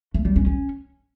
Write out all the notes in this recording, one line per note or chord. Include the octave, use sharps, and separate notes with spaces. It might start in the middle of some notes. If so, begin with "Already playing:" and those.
A3
G3
C#4
C#4